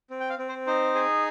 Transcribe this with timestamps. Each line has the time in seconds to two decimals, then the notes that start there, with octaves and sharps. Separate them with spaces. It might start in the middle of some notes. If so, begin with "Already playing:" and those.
0.10 C4
0.20 G5
0.29 F5
0.38 C4
0.49 C5
0.67 D#4 C5
0.95 G#4